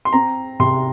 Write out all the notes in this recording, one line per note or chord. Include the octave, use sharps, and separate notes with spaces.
C6
C4 A#5
C3 C6